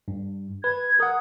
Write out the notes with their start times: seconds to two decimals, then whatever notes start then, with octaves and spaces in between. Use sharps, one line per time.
0.08 G2
0.64 B4 G#6
1.00 A#4 F#5 D#6